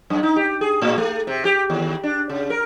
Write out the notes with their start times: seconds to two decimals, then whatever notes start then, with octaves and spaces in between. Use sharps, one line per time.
0.10 F#2
0.23 D#4
0.36 G4
0.61 G#4
0.82 A2
0.98 A3
1.27 C3
1.45 G4
1.70 D#2
2.03 D4
2.30 C#3
2.50 A#4